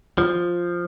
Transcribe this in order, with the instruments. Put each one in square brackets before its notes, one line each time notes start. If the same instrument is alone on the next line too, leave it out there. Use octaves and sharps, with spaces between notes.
[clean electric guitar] F3